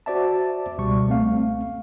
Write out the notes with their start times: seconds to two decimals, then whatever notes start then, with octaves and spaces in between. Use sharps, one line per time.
0.06 F#4 C5 D5 E5 A5
0.78 C#2 B2 G3 C#6
1.08 A3 C4 F5